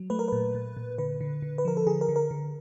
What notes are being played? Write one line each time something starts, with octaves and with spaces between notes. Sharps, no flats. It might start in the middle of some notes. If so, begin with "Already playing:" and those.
Already playing: F#3
A3 B4
A#4
A#2 B4
A#2
A#2
D3 B4
D3
D3
B4
F3 A#4
A4
D3 G#4
A#4
D3
A#4
D3